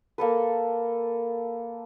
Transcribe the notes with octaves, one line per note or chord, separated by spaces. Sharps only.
A#3 A4 B4